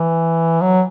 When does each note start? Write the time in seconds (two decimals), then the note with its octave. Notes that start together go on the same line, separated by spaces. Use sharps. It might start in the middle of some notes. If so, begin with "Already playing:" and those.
Already playing: E3
0.61 F#3